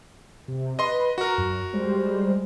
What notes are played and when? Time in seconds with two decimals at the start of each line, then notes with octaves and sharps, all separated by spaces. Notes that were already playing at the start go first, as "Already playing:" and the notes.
0.48 C3
0.79 B4 D#5 B5 C6
1.18 F#4 A#4 A#5
1.38 F#2
1.73 G3 G#3 C5